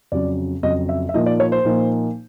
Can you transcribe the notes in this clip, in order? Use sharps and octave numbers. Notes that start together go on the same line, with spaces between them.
F2 C#3 F#3 D5
F2 C#3 F#3 D#5
E5
E5
A#2 F3 A#3 D#4 D#5
D5
C#5
C5
A#2 F3 A#3 D#4